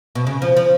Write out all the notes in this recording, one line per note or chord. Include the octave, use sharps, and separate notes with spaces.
B2
C#3
F3
F3